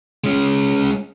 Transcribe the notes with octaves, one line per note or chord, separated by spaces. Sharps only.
G#3 C#4